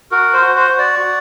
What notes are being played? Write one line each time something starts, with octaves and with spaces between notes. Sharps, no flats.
F#4 A#4
C5
F#4
C5
F#4
D5
F#4